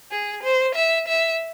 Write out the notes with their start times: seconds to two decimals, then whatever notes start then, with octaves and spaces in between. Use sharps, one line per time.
0.11 G#4
0.43 C5
0.75 E5
1.08 E5